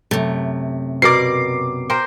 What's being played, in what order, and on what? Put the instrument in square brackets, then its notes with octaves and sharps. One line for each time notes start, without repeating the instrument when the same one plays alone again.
[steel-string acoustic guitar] F#2 C3 [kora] A3
[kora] B2 A#4 D5 [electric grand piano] D6 C7
[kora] A#4 C5 G5